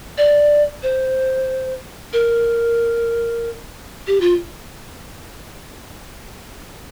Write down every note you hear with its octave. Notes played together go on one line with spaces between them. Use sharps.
D5
C5
A#4
G4
F4